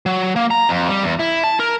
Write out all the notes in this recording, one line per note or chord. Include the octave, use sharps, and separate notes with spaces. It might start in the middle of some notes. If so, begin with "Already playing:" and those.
F#3
A#3
A#5
F2
G3
E2
E4
A5
A#4